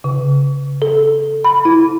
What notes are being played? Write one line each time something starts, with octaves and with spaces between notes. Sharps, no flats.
C#3
A4
B5
E4